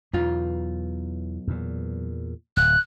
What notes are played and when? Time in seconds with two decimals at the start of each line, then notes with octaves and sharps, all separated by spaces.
0.13 B1 E2 F4
1.48 E2 A#2
2.57 D1 F#6